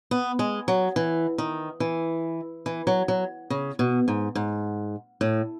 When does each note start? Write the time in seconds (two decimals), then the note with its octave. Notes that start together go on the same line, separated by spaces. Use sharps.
0.11 B3
0.39 G#3
0.68 F#3
0.96 E3
1.38 D#3
1.80 E3
2.66 E3
2.87 F#3
3.08 F#3
3.50 C#3
3.79 B2
4.08 G#2
4.35 G#2
5.21 A2